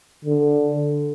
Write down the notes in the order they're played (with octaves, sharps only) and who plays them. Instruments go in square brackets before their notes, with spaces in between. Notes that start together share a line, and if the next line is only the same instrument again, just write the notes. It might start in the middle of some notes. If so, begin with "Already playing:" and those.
[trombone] D3